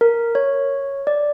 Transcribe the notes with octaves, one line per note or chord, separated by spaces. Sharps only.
A#4
C#5
D5